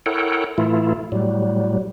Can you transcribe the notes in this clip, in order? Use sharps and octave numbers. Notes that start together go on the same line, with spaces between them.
E4 A4 A#4 C#5 F#5 G5
A2 E3 A3 E4 F4
A2 F#3 G3